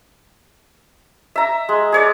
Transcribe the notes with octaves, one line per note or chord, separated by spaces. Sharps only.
E5 A#5
G#3
G#4 C#5 D5